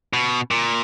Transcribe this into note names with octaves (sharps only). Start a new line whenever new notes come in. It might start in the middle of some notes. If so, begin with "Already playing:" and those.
B2
A#2